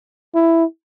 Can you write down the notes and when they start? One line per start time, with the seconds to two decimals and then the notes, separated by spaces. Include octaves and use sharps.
0.35 E4